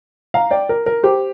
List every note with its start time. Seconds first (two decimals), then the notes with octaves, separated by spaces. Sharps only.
0.34 F5 A#5
0.51 D5 G5
0.69 A#4
0.86 A#4
1.03 G4 C5